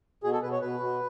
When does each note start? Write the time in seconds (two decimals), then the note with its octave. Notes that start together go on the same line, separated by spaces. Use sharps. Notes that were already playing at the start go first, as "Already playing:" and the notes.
0.24 B2 G#4
0.33 A4
0.42 B2 B4
0.52 C#5
0.61 B2 B4
0.80 B2